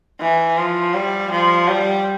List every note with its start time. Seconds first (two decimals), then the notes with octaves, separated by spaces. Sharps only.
0.21 E3
0.58 F3
0.94 G3
1.31 F3
1.68 G3